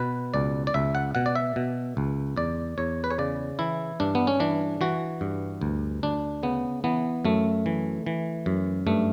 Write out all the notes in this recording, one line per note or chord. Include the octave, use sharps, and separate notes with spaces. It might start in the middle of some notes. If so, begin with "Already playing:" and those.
Already playing: B2 B4
C#2 D5
D5
C#2 E5
F#5
B2 F#5
D5
E5
B2
C#2
E2 D5
E2 C#5
B4
C#5
C#3 D5
E3 E4
G2 D4
B3
C#4
E3 D4
E3 F#4
G2
D2
D2 D4
C#3 B3
E3 B3
F#2 A3
E3
E3
F#2
G2 A3